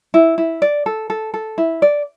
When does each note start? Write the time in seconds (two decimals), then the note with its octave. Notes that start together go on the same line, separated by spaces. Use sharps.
0.14 E4
0.38 E4
0.62 D5
0.86 A4
1.10 A4
1.34 A4
1.58 E4
1.82 D5